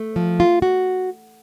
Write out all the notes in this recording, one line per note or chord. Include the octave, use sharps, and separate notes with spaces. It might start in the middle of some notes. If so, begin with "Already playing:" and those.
Already playing: A3
F3
F4
F#4